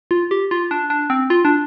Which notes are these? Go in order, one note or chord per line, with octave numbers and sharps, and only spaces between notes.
F4
G4
F4
D4
D4
C4
F4
D4